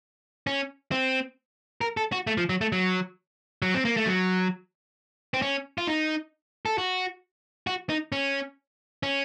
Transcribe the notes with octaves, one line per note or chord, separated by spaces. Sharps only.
C#4
C4
A#4
A4
F#4
A3
F3
F#3
A3
F#3
F#3
C4
A#3
A3
F#3
C4
C#4
F4
D#4
A4
F#4
F#4
D#4
C#4
C#4